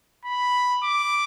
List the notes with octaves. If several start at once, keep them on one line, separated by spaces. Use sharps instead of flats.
B5
D6